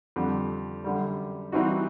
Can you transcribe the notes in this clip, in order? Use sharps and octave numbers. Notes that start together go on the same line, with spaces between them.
F2 D3 G3
F#2 D3 G3
E3 G3 C4 D#4 F#4